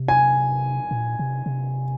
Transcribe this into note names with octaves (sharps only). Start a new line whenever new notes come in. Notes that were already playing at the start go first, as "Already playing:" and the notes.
Already playing: C3
G#5
A#2
C3
C3